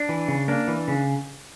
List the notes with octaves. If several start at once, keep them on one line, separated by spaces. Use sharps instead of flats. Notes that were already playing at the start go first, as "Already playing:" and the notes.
Already playing: D4
E3
C#3
A#3 D4
E3
C#3